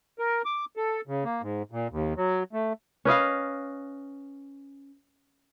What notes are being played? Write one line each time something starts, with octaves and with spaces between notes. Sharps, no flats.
A#4
D6
A4
C#3
A#3
G#2
A#2
D#2
F#3
A3
C#4 B4 D#5 F5